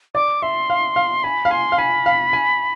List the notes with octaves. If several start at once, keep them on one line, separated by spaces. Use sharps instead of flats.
D5 D6
E5 C6
F5
F5
G#5 B5
F5
G#5 C6
F5
G#5 B5
F5
G#5